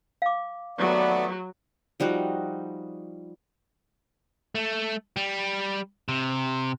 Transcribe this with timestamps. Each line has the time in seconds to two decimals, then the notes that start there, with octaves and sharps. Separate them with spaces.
0.22 F5 D6
0.78 D#2 F#3 A3 B3 D5
2.00 F3 G3 D#4 F#4
4.55 A3
5.16 G3
6.08 C3